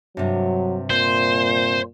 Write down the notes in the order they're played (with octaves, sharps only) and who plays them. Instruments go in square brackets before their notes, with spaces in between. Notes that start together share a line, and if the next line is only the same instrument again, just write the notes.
[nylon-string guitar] G2 C3 [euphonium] F#3
[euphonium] A#2 [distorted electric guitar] C5